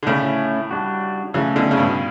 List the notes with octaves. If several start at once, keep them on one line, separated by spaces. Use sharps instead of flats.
D3
A2 C#3 A3 C#4 E4
G3 D4 F#4
C#3 E3 F#3 A3 C#4
B2 D3
C#3
G2 B2